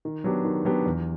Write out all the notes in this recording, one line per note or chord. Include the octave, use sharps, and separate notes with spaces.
D#3
F#3 B3 D4 G4
D#3
F#3 B3 D4 G4
E2